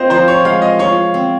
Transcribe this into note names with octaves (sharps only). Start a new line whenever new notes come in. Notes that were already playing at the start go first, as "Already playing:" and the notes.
Already playing: C4 F4 C5 D#5
F3 C5
C#5
G#3 F5
D#5
F4 C#5
C4